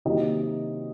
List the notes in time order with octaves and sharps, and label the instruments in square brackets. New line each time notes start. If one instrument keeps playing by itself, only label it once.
[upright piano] C3 D#3 F#3 A#3 D#5